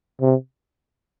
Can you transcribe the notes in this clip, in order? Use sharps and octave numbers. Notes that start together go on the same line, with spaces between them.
C3